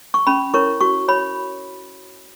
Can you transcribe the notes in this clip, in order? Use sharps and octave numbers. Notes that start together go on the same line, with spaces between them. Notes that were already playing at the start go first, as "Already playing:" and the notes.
C#6
C#4 B5
E4 A#4 C#5 C#6
F#4 C#6
C#5 B5